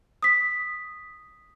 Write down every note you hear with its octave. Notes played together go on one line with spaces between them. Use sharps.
D#6 B6